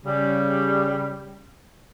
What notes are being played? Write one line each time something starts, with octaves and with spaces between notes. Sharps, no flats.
C#3 G3